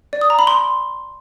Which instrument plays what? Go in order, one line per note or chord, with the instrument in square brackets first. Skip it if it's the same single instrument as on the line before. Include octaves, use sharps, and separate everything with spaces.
[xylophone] D5
D#6
A#5
B5
C6